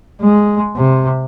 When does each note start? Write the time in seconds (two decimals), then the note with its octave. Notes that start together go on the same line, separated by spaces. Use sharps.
0.21 G#3
0.76 C3